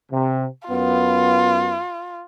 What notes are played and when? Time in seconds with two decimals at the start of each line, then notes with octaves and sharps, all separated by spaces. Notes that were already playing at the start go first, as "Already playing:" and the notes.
0.10 C3
0.68 F#2 B3 F4